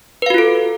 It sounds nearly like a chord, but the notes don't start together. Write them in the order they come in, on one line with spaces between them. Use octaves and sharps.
B4 F5 F#4 F4 A4